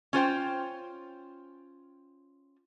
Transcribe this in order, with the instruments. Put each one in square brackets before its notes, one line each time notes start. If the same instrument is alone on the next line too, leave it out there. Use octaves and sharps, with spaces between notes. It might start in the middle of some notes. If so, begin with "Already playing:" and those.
[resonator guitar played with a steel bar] C#4 F4 C5 G5